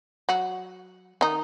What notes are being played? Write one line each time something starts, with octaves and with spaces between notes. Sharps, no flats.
F#3 F#4
D#3 D#4